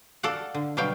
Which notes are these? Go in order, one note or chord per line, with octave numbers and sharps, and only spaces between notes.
A4 D5 F5 F#5
D3
B2 F#3 G3 F5 G5